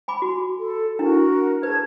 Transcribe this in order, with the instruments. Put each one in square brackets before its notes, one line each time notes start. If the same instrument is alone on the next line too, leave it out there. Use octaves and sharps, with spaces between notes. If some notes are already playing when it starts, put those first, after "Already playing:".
[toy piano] G#5 B5 D6
F#4
[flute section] A4
[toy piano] D4 E4 [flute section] F#4 A#4
[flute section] G#4 A5 G#6 [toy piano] B4